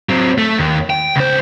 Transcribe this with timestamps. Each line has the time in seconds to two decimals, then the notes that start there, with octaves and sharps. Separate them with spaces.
0.09 F#3 C4
0.38 A3
0.58 D#2
0.90 G5
1.16 C#2 C5